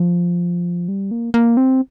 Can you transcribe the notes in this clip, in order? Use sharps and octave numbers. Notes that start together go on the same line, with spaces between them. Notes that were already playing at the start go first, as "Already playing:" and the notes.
Already playing: F3
G3
A#3
A#3
C4